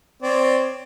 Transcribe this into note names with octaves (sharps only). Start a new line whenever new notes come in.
C4 C#5 D5